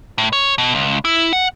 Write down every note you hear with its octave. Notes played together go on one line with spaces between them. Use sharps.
A2
C#5
B2
C#2
E4
F#5